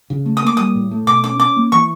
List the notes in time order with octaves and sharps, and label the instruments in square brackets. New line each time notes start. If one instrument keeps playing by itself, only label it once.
[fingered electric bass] C#3
A3
[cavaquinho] D#6
[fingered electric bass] A#3 [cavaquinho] D6
[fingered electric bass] G3 [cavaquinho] D#6
[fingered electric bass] A2
A3
[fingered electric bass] B2 [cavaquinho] D6
[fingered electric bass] C#4 [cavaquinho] D6
[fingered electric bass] C#4 [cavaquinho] D6
[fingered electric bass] A#3
[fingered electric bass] E3 [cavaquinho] C#6